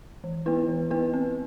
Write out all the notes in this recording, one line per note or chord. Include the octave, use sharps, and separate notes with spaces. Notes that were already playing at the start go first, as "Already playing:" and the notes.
E3
B3 E4 B4
E3
B3 E4 B4
C4